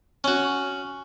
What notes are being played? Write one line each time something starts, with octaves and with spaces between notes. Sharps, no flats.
C#4 F#4